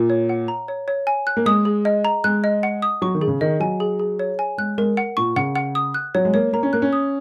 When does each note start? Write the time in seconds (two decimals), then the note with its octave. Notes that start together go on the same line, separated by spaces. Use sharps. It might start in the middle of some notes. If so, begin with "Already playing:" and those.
Already playing: A#2
0.10 C#5
0.29 F#5
0.48 A#5
0.68 C#5
0.88 C#5
1.07 G#5
1.27 F#6
1.37 A#3
1.46 G#3 D#6
1.65 G#4
1.85 D#5
2.05 A#5
2.24 G#3 F#6
2.44 D#5
2.63 F#5
2.82 D#6
3.02 F#3 C#6
3.15 D#3
3.21 G#4
3.28 C#3
3.41 D#3 D#5
3.60 F#3 G#5
3.80 G#4
3.99 G#4
4.19 C#5
4.39 G#5
4.58 G#3 F#6
4.78 G#3 A#4
4.97 F#5
5.17 A#2 C#6
5.36 C#3 F#5
5.56 F#5
5.75 D#6
5.94 F#6
6.15 F#3 C#5
6.25 G#3
6.34 A#3 C#5
6.53 A#3 A#5
6.63 C#4
6.73 A#3 F#6
6.82 C#4
6.93 D#6